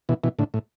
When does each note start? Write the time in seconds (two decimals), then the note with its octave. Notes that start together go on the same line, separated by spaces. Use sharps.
0.09 B2 E3
0.24 B2 E3
0.39 A2 D3
0.54 A2